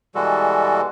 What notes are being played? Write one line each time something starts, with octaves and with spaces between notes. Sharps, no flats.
B2 E3 G3 G#3 F#4 A4